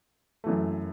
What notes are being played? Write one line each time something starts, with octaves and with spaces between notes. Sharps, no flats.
F#2 E3 A3